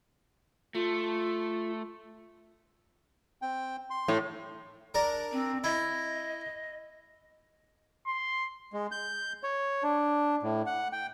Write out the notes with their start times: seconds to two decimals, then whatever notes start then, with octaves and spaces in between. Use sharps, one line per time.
0.75 A3 F4
3.42 C4 G5
3.90 C6
4.08 A2
4.94 D4 A#4
5.32 C4
5.64 E4 D#5
8.07 C6
8.73 G#3
8.92 G6
9.43 C#5
9.83 D4
10.43 A2
10.66 F#5
10.92 G5